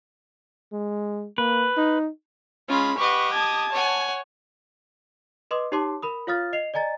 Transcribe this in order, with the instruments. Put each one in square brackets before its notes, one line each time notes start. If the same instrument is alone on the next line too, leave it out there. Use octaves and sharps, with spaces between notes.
[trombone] G#3
[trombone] A#3 [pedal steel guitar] B4
[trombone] D#4
[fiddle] G#3 B5 [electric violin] C#4 [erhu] F4
[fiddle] G4 D#5 [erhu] B4 [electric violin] F#5 C#6
[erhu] A5 [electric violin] D#6 G#6
[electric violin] C#5 [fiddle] F#5 G#5
[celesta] B4 D#5 C6 D6 D#6
D#4 G4 C#5 A5 C6 D6
A#4 B5 D#6
F4 C#5 F5 D#6 F6 A6
D#5 C7 F7
D5 D#5 G#5 A#5 A6